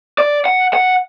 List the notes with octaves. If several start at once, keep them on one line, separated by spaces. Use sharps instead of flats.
D5
F#5
F#5